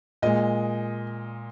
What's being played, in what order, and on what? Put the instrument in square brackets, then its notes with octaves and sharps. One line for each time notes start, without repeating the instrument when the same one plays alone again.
[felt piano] A#2 G#3 D#5